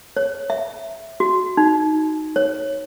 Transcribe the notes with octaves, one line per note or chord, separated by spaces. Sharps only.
C#5
E5
F#4
D#4
C#5